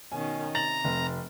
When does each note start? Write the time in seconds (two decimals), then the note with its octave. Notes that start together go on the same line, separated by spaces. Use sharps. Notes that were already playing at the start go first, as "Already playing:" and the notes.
0.12 B2 D#3 C#4 G#5
0.55 C3 A#5 A6 F#7
0.84 F1